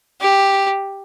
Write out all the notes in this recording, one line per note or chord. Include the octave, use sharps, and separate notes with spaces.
G4